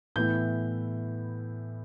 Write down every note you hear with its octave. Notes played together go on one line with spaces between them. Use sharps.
A2 E3 B3 E4 G6